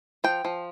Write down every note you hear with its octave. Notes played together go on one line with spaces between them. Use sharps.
F3 G5
F3